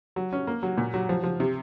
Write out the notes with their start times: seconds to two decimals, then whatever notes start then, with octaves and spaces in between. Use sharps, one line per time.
0.16 F#3
0.33 C#4
0.47 A#3
0.63 F#3
0.77 A#2
0.94 F#3
1.09 F3
1.24 F3
1.40 C3